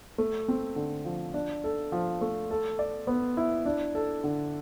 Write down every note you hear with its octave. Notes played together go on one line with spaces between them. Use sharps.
A3
C4
D3
F3
D4
A4
F3
A3
A4
D5
B3
E4
D4
A4
D3